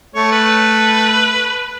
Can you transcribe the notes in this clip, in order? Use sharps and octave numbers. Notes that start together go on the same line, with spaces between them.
A3 C#5
B4